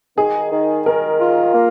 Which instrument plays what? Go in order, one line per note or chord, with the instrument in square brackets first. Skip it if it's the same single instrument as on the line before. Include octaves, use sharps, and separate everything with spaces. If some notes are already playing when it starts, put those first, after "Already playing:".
[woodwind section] D#3 [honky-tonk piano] G#4
[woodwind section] D#3
[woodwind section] D#3 [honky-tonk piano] A#4
[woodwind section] F4
A#3